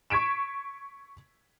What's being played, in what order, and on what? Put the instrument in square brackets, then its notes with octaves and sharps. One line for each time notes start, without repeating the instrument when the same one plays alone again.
[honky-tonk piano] C#6 G#6 B6 D7 E7